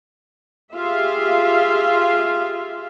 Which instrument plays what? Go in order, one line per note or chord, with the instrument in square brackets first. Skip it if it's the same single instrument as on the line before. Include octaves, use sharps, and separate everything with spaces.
[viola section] F4 G4 G#4 E5 F5